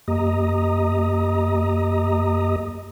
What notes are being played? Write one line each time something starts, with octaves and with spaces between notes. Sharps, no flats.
F#2 A#3 G4 D#5 A#5 D#6